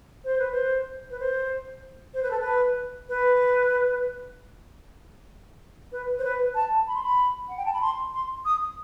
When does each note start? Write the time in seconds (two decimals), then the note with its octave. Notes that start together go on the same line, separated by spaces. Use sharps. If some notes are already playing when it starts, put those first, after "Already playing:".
0.24 C5
0.39 B4
0.52 C5
1.10 B4
1.20 C5
2.14 C5
2.23 B4
2.31 A4
2.40 B4
3.09 B4
5.92 B4
6.19 C5
6.24 B4
6.55 A5
6.87 B5
6.95 C6
7.03 B5
7.48 F#5
7.57 G5
7.65 A5
7.73 B5
7.81 C6
8.13 C6
8.45 D#6